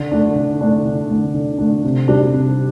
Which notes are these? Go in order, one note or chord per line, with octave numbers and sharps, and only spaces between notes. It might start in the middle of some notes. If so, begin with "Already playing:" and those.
Already playing: D3
A3 D4
D3
A3 D4
D3
A3 D4
D3
A3 D4
C3
G3 D4
C3